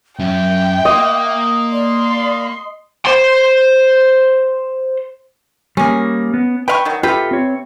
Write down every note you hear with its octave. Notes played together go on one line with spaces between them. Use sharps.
F#2 C#4 E5 G5
A#3 D#5
D5 C6
C5 C6
G3 A#3 C#4 G#4
B3
B4 F5 G5 C#6
D#3 F#3
C3 F4 G4 A4 B4 G5
C4 C#5